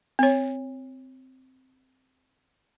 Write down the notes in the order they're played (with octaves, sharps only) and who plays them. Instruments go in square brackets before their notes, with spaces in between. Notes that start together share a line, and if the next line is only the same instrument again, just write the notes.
[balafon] C4 C#5